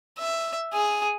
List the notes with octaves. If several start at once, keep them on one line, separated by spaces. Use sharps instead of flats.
E5
G#4